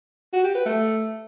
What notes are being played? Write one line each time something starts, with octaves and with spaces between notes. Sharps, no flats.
F#4
G4
B4
A3